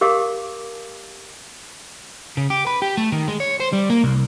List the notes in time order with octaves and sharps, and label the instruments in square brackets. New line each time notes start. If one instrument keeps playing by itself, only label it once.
[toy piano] G4 A#4 F5 D6
[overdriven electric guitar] C#3
G4
B4
G4
A3
D#3
G#3
C#5
C5
G3
A#3
C2